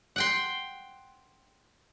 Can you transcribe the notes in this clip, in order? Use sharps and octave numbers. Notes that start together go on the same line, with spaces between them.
F#5 G5 C6